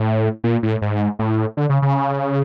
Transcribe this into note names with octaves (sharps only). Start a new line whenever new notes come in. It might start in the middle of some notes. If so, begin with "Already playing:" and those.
Already playing: A2
A#2
A2
G#2
A2
D3
C#3
C#3